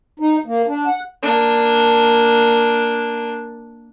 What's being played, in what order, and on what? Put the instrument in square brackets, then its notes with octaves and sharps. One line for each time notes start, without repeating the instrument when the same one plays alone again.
[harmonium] D#4
A#3
D4
F#5
[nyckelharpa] A#3 D4